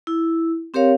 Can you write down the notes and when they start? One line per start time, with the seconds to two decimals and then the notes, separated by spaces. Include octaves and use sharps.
0.07 E4
0.74 C4 G4 A#4 C#5 F5